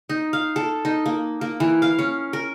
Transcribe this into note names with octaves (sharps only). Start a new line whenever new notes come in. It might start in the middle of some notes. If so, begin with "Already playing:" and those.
D#4
F5
A4
D#4
A#3
A#3
E3
F5
C#4
A#4